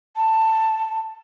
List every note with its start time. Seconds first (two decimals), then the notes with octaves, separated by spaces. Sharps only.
0.16 A5